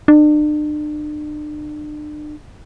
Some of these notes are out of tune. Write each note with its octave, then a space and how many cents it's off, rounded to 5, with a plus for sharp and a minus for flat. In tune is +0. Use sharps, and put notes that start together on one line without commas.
D4 +40